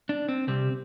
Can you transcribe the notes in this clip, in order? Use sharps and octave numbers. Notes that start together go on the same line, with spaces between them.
D4
C4
C2 C3 G3 C4